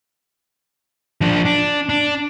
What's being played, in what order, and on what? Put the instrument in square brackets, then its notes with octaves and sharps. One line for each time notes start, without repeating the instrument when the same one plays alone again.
[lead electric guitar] F3 D4
D4
D4